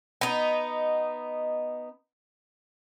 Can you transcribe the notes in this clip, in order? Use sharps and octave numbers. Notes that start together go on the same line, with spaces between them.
B3 D#4